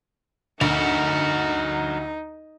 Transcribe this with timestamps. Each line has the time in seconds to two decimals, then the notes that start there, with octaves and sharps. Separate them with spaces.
0.61 D2 D#4 F#4 A#4